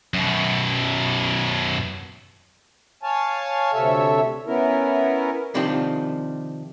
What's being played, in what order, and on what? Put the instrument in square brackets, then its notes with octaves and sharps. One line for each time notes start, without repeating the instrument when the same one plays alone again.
[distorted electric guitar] F#2 B2
[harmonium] C#5 F5 G#5 A5
D2 C3 A4 C#5 E5
B3 C#4 E4 A#4
[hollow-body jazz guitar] C3 D#3 F3 C4 D4